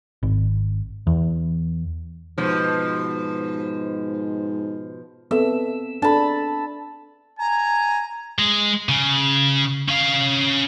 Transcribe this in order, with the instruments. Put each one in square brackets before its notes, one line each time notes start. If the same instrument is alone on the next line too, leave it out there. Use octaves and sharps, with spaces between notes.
[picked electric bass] G#1
E2
[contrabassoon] G#2 [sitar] B2 F3
[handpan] B3 C4 A4 [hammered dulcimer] E5
[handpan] D4 A4 [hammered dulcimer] A5 B5
[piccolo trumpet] G#5 [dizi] A#5
[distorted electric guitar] G#3
C#3
C#4 F5